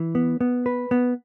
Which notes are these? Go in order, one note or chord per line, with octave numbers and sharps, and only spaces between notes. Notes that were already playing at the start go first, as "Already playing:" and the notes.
Already playing: E3
B3
B3
B4
B3